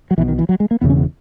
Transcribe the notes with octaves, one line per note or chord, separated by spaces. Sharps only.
F#3
B1 B2 E3
D#3
E3
F#3
G#3
A#3
E1 E2 C#3 B3
C#4
B3